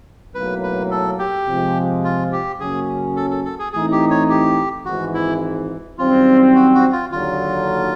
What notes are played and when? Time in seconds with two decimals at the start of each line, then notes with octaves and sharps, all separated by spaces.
0.35 B1 A2 F#3 A#3 B4
0.63 B4
0.91 A4
1.19 G4
1.47 C3 F3 G#3
2.04 F4
2.32 G4
2.60 F#2 C#3 F#3 A#3 C#4 G#4
3.17 A4
3.31 A4
3.45 A4
3.59 G#4
3.73 A2 E3 A3 C4 D#4 G#4
3.92 G4
4.10 C#5
4.29 G4
4.85 G#1 G#2 E3 F#4
5.14 E4
5.98 F#2 D#3 G3 C4 F4
6.55 F#4
6.74 F#4
6.92 F4
7.11 D#2 D3 F#3 F4